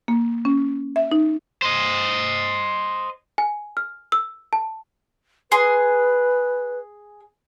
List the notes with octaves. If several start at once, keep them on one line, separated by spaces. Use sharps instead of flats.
A#3
C#4
E5
D#4
C5 D#5
G#5
F6
E6
A5
G#4 B4 C6